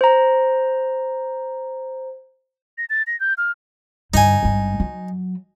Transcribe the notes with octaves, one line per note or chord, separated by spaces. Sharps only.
C5 A#5
A#6
A6
A#6
G6
F6
G2 D3 D#4 G#5
G#1 G2
F#3